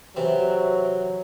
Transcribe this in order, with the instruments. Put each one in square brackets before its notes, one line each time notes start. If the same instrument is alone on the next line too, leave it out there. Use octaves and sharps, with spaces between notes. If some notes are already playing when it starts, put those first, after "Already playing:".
[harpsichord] C3 E3 C4 [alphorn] F#3